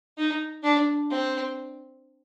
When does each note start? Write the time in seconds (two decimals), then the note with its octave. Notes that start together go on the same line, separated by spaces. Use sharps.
0.18 D#4
0.63 D4
1.11 C4